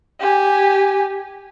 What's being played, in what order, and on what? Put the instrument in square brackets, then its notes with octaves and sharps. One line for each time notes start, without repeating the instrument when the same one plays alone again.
[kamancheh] G4 G#5